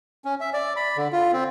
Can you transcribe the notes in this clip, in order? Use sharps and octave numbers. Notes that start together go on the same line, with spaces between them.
C#4
E5
D5
B5
D3
F4
C4